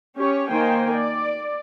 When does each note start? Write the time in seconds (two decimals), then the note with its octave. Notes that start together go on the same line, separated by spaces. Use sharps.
0.16 C#4 G4 C#5
0.50 D#3 A#3 C5 G5 G#5
0.92 D5